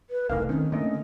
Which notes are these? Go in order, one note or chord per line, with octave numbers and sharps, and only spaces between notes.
B4
F1 C2 A3 D#4 A#4 F5
D#3 C4 C#4
D3 A3 A#3 D#5